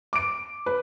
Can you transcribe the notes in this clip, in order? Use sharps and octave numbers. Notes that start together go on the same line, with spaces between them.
D6 D7
B4